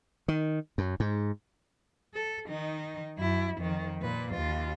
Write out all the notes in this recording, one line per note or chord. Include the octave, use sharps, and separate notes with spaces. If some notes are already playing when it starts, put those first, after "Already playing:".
D#3
F#2
G#2
A4
D#3 D#4
F#2 E4
F2 D#3
A#2 B4
D#2 F4